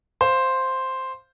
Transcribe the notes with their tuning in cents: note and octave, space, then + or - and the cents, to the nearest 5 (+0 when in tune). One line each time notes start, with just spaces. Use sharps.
C5 +0 F5 +0